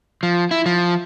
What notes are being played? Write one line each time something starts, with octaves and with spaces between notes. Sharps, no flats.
F3
E4
F3